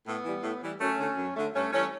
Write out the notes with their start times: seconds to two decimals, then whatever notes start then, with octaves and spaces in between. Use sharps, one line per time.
0.06 A2 B3
0.24 E3 G3
0.42 A2
0.62 E3 G3
0.80 F#2 A3 C#4
0.99 D3 A3
1.17 F#2
1.36 D3 A3
1.54 G2 A3 C#4
1.72 E3 G3 A3 C#4